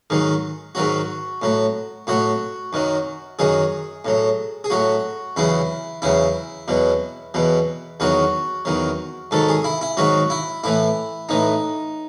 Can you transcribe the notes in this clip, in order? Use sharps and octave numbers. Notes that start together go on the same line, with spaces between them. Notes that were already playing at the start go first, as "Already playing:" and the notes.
G#2 D#3 F#3
G#2 D#3 F#3 F#4
A2 F#3
A2 F#3 F#4
F#2 D#3 F#3
F#2 D#3 F#3 G#4
A2 F#3
G#4
A2 F#3 F#4
E2 C#3 F#3 E4
E2 C#3 F#3 E4
E2 B2 F#3
E2 B2 F#3
E2 D#3 F#3 F#4
E2 D#3 F#3
G#2 D#3 F#3 A4
G#4
E4
E4
G#2 D#3 F#3 F#4
E4
A2 E3 E4
A2 E3 D#4